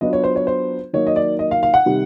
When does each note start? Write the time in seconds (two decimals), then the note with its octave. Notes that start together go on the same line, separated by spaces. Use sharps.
0.01 F#3 B3 D4 F4 D#5
0.13 C#5
0.24 C5
0.36 C#5
0.47 C5
0.93 D#3 F#3 A#3 D#4 C#5
1.07 D#5
1.16 D5
1.39 D#5
1.51 F5
1.63 F5
1.74 F#5
1.86 C3 D#3 G3